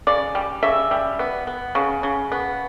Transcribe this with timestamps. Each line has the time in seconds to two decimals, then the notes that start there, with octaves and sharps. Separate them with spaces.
0.07 C#3 D5
0.35 G3
0.63 C#3 E5
0.91 G3
1.19 B3
1.47 B3
1.75 C#3
2.03 C#3
2.32 B3